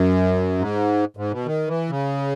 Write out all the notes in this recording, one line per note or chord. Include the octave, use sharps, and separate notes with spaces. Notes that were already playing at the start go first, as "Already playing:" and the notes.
Already playing: F#2
G#2
G#2
B2
D#3
E3
C#3